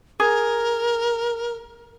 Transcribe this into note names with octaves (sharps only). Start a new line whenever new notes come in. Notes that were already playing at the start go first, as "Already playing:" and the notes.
G#4 A#4